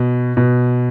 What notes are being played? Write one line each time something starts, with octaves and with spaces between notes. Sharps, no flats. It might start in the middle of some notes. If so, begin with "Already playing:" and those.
Already playing: B2
B2